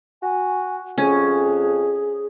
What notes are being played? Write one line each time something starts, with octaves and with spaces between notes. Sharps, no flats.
F#4 G#5
F2 C#4 G#4